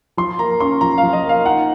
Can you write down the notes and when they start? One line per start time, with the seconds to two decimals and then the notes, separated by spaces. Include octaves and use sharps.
0.17 F3 C6
0.39 A#3 A#5
0.60 C#4 C6
0.81 F3 A#5
0.98 F5
1.03 F3
1.13 D#5
1.24 A#3
1.29 F5
1.45 D#4 F#5